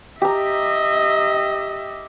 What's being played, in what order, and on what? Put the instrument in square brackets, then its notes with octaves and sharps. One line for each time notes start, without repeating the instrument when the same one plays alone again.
[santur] G4 A#5 [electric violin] D#5 E5